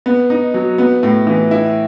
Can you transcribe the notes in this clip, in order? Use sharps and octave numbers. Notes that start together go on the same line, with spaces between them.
B3
D#4
F#3
B3
A2
E3
E4